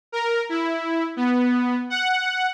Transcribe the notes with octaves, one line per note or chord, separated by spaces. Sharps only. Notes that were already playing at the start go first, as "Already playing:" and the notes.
A#4
E4
B3
F#5